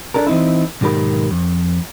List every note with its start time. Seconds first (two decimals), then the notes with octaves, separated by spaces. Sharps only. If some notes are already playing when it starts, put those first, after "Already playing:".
0.14 D4 A4 A#4
0.27 E3 C4 D#4 E4
0.81 B1 G#2 D#3 G4 A#4 B5
1.31 F2